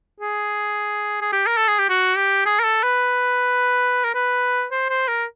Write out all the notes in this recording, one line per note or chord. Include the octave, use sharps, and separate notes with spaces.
G#4
G#4
G4
A#4
A4
G#4
G4
F#4
G4
G#4
A#4
A4
B4
A#4
B4
C5
C5
A#4